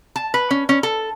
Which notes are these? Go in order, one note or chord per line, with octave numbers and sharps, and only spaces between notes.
A5
B4
C#4
C#4
A4